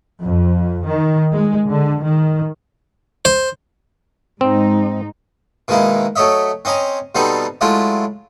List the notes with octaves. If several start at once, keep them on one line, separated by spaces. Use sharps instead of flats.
F2
D#3
G#3
D3
D#3
C5
G#2 C4 D#4
B2 D#3 G#3 A#3 E4
F#3 A3 C#5 D#5 E5
C4 C#4 D#5 G#5 A#5
B2 G3 B3 C4 D#4 A4
F#3 G#3 A3 E4 F4